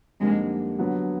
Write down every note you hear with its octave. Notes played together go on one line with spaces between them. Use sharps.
F2 D3 G3 G#3 A#3 D#4
D3 F#3 B3